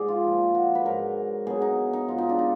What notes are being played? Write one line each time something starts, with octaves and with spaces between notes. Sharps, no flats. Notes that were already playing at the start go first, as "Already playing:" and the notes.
Already playing: G#2 G#4 D5
F4
A#2 F3
F#4
B4
G#2 F#3 A#4
B2 F#3 G#4
D#4
D#4
G#2 F#3 F4
D#4
D4
D#4